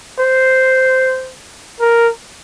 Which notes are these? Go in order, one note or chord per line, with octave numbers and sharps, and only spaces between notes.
C5
A#4